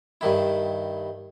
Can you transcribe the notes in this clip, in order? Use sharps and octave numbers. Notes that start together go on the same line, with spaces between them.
G2 D#3 E4